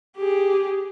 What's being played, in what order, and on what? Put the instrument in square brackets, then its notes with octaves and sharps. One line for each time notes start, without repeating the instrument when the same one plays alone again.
[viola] G4 G#4